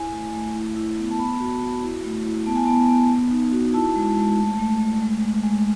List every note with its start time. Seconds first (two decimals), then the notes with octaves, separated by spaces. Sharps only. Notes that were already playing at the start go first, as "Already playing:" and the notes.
Already playing: E4 G#5
0.13 A3
0.34 A3
0.54 E4
0.76 E4
0.97 B3
1.11 A5
1.19 B3 B5
1.40 F#4
1.62 F#4
1.82 E4
2.04 A3
2.25 E4
2.46 B3 A5
2.56 G#5
2.65 B3 A5
2.88 B3
3.09 B3
3.31 D#4
3.52 F#4
3.74 E4 A5
3.96 G#3
4.17 G#3
4.37 A3
4.59 A3
4.80 A3
5.01 G#3
5.22 G#3
5.44 G#3